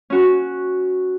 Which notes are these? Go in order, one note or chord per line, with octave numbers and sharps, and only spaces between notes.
C#4 F#4